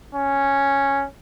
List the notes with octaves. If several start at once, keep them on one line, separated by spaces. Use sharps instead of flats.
C#4